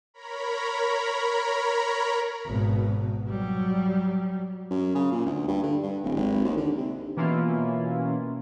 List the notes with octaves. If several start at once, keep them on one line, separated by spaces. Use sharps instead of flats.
A#4 C#5 A#5 B5
G#1 B2
F#3 G3
F#2
C#3
A#2
D2
G2
D3
G2
D1
G#1
D#2
D3
C3
B2 E3 A#3 C#4 E4 F4